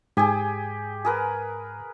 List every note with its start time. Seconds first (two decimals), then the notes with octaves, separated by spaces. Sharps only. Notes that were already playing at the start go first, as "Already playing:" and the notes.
0.17 G#2 G4 G#4 G#5
1.05 G#4 A#4 B4